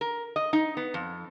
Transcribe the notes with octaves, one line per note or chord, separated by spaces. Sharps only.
A#4
D#5
D#4
B3
F2